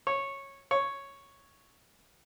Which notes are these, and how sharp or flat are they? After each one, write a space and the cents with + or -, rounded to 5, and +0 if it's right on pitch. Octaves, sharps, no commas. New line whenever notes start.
C#5 -10
C#5 +0